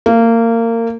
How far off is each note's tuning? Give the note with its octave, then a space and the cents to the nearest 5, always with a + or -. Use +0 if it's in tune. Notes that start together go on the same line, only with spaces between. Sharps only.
A#3 -25